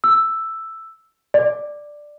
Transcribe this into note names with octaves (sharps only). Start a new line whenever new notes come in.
E6
D5